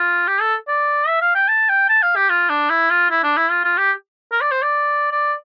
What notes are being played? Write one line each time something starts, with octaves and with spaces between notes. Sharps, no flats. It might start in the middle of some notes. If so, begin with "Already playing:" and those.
Already playing: F4
G4
A4
D5
E5
F5
G5
A5
G5
A5
F5
G4
F4
D4
E4
F4
E4
D4
E4
F4
F4
G4
A#4
D5
C5
D5
D5